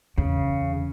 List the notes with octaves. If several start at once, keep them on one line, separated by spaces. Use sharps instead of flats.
E2 C#3